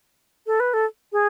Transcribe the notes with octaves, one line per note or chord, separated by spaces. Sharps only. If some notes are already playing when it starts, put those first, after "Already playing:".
A4
B4
A4
G#4